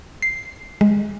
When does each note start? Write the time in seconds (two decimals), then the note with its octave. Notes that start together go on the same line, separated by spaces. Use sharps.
0.22 C7
0.81 G#3